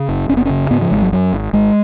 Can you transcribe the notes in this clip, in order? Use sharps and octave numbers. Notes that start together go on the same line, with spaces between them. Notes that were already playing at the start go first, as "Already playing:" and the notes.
Already playing: C#3
F#1
F#1 C#4
B3
C#3 C#4
G#2 B3
F3
G#1 G#3
F#3
F#2 F#3
G#1
G#1 G#3